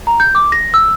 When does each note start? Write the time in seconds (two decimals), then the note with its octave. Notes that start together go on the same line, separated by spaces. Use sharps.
0.07 A#5
0.20 G6
0.35 D6
0.52 A#6
0.74 E6